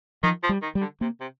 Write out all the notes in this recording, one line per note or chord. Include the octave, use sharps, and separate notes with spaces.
D#3 F3
F3
G3
D#3
G3
D3
C3 A#3
C3